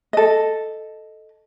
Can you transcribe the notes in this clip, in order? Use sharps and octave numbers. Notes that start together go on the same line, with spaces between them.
A4 D#5